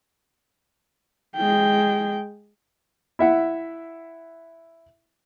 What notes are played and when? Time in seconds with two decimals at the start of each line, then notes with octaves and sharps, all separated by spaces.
1.36 G#3 G5
3.19 E4 E5 F#5